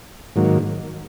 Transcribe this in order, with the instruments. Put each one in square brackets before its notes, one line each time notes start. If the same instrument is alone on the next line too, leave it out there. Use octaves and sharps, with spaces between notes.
[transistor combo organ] G#2 D#3 F#3 A#3